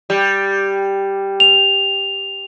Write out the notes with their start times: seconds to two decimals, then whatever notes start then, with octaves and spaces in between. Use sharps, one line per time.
0.10 G3
1.40 F7